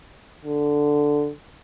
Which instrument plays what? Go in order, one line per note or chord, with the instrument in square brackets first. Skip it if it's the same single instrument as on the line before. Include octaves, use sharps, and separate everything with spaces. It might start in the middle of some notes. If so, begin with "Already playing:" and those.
[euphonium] D3